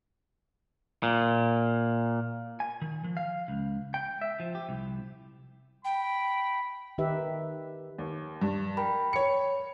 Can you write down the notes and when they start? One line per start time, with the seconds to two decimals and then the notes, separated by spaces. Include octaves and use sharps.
1.03 A#2
2.60 G#5
2.82 D#3
3.04 F3
3.17 F5
3.48 C#2
3.94 G5
4.22 E5
4.40 F3
4.55 G4
4.69 C2
5.85 G5 B5
6.98 D#3 D#4 G4 B4 E5
7.99 D#2
8.42 G2
8.77 A#4 G5 B5
9.13 C#5 C#7